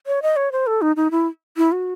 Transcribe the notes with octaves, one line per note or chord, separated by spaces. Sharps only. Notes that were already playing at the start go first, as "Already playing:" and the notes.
C#5
D#5
C#5
C5
A4
D#4
D#4
E4
E4
F#4